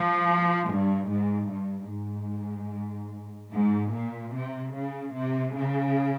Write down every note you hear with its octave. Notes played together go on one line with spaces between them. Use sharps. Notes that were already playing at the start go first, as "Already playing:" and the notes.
Already playing: F3
G2
G#2
G2
G#2
G#2
A#2
C3
C#3
C3
C#3